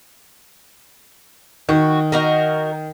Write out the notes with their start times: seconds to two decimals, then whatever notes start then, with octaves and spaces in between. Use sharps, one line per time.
1.69 D#3 F#4
2.12 D#4 F#4 A#4